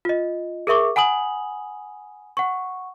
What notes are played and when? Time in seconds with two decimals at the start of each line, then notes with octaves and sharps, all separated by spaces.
0.05 F4 D#5
0.67 G#4 A#4 E5 C#6 D6
0.96 F#5 G#5 B5 D#6 F#7
2.37 F#5 C#6